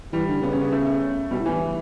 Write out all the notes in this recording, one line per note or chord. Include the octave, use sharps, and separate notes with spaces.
E3 G3
D3
C#3 B3
C#4
B3
A3
B2 G3
A2
E3
G2